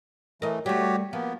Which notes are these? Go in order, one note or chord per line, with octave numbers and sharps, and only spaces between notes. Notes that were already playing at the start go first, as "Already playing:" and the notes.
E3 A3 A#4 D#5
G3 A3 F#4 G4 C#5
F3 A#3 B3